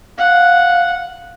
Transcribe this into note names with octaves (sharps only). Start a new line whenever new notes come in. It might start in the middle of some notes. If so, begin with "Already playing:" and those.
F5 F#5